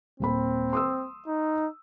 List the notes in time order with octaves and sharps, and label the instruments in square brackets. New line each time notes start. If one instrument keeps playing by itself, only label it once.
[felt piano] D#1 A#3 B5 [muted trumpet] C4
[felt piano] C6 D#6 E6
[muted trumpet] D#4